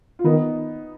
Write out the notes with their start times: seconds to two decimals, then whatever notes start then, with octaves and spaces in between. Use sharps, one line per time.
0.19 F4
0.25 D#3 B3 D#4